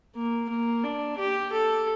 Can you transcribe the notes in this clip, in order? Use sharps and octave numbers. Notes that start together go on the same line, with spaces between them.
A#3
A#3
D4
G4
A4